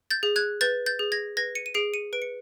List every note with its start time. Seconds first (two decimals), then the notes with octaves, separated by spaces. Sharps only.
0.11 G6 A6
0.23 G#4
0.36 F#6 G#6
0.61 B4 G6 A6
0.86 G6 A6
0.99 G#4
1.12 G#6 A#6
1.37 B4 G#6 A#6
1.55 C#7 D#7
1.66 D#7
1.74 G#4 C7 D7
1.94 C#7 D#7
2.13 B4 D7
2.22 C#7